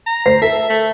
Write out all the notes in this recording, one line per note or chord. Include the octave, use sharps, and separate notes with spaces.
A#5
D2 C5 C7
A4 A#4 E5
A3